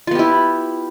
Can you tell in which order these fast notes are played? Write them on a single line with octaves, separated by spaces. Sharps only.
F4 B3 G4 E4